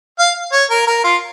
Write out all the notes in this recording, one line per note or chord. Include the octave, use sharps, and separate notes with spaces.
F5
C#5
A#4
A#4
F4